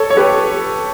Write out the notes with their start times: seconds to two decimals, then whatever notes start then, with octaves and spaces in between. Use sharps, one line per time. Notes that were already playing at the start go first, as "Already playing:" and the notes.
Already playing: A4 C#5
0.10 C#5
0.17 G4 B4